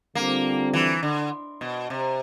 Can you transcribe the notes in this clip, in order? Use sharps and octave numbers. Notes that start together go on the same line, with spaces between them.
D3 G3 A#3 C4 F4
E3
D3
B2
C3